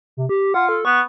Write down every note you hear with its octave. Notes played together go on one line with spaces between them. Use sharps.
C3
G4
F4 F#5
A4
B3 C#6